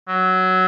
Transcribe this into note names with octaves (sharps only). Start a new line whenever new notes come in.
F#3